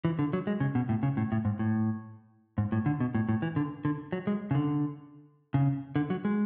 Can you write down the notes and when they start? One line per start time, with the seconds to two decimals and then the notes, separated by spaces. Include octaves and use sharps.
0.05 E3
0.19 D3
0.33 F#3
0.47 G#3
0.60 C#3
0.75 B2
0.89 A2
1.03 C#3
1.17 A2
1.32 A2
1.45 G#2
1.59 A2
2.58 G#2
2.72 A2
2.86 D3
3.00 B2
3.15 A2
3.29 A2
3.42 E3
3.56 D3
3.85 D3
4.12 F#3
4.27 G#3
4.51 C#3
4.55 D3
5.54 C#3
5.96 D3
6.10 F#3
6.25 G#3